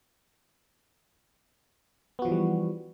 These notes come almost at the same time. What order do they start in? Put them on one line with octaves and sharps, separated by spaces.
B3 F#4 F3 E3 G3